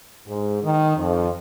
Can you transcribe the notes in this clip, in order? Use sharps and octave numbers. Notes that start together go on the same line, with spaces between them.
G#2
D#3
F2